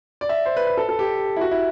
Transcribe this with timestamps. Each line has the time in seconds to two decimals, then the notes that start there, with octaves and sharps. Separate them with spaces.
0.21 D5
0.29 E5
0.46 C5
0.57 B4
0.67 B4
0.77 A4
0.89 A4
0.99 G4
1.36 E4
1.41 F#4
1.51 E4